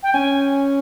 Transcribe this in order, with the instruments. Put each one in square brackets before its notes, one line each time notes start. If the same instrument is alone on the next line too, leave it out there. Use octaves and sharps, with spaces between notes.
[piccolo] G5
[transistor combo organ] C#4 [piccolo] G#5